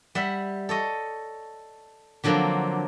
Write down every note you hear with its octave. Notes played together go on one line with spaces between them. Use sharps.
G3 E5 F#5
A4 C#5 D#5
D3 F3 F#3 A#3 C4 D4